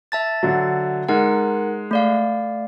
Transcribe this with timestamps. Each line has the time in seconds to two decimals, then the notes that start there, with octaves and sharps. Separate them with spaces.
0.12 E5 A5 A6
0.43 D3 F#3
1.09 G#3 D#4 A#4 F#5
1.91 A3 D5 F5